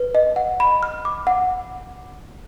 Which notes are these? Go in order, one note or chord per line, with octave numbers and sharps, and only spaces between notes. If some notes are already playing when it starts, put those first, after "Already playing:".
Already playing: B4
D#5
F#5
B5
F6
D6
F#5